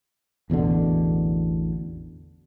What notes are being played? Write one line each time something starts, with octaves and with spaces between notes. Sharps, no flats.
A1 E2 B2 D3